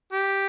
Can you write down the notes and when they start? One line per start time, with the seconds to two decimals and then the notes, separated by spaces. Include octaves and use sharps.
0.12 G4